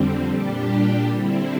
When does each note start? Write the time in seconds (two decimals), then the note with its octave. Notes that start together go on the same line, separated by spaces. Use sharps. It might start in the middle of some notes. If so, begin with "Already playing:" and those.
Already playing: F2 D3 G3 C4
0.29 A#2 G3 D4 G4
1.08 D3 G3 C4 E4